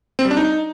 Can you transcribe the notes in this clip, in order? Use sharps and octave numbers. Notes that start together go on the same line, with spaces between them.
C4
G3
D4
D#4